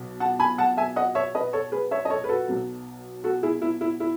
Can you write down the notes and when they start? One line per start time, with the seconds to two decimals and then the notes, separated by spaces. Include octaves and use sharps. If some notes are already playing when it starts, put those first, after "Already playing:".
Already playing: B1 B2
0.20 F#5 A5
0.39 G#5 B5
0.58 F#5 A5
0.77 E5 G#5
0.96 D#5 F#5
1.15 C#5 E5
1.35 B4 D#5
1.53 A4 C#5
1.72 G#4 B4
1.91 C#5 E5
2.05 D#5
2.10 A4 C#5
2.24 B4
2.29 F#4 A4
2.48 B1 B2 F#3
3.24 F#4 A4
3.43 E4 G#4
3.62 E4
3.81 E4
4.00 E4